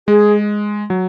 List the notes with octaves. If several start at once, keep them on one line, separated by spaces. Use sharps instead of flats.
G#3 G#4
F#3